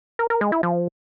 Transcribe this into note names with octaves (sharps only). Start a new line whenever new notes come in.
A#4
A#4
G#3
E4
F3